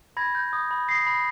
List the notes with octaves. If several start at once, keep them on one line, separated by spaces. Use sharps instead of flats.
B5 G#6 A#6
G6
D#6
B5
D#6 A#6 C7
B5